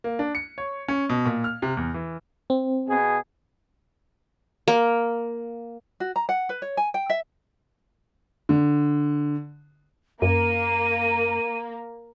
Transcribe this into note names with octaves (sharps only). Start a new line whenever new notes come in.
A#3
D4
C#7
C#5
C#4
B2
A#2
F6
C3
E2
E3
C4
B2 G#4
A#3
F#4
A#5
F#5
B4
C#5
G#5
G5
E5
D3
F#2 A#3 D#7